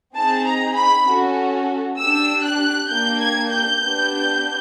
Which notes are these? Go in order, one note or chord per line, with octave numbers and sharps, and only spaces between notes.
C4 D#4 G#4 A5
A#5
B5
C#4 F#4 A4
D4 G4 E6
F#6
A#3 D4 G4 G6
G#6
G6
B3 D4 G4